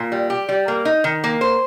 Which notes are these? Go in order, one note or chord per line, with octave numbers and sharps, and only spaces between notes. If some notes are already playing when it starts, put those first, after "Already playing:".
Already playing: A#2
G3
G4
G3
A#3
D#4
D#3
A#3
C5